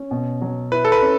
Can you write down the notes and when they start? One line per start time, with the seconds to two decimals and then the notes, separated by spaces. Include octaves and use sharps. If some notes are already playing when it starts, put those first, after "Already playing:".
Already playing: C#4
0.11 B2
0.41 F#3
0.72 E4 B4
0.85 A4
0.92 B4
1.02 C#4